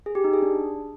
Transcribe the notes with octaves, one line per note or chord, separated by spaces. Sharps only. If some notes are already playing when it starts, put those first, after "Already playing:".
G#4
G4
D#4
G#4
D4